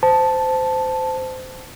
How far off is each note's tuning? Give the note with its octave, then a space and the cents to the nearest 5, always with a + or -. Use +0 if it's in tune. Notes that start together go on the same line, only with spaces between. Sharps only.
C5 -20 A5 -5